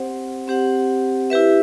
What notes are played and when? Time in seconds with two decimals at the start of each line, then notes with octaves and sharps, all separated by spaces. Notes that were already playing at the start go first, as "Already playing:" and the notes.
Already playing: C4 G4 C5 F#5
0.48 C4 G4 C5 F#5
1.30 E4 G4 B4 E5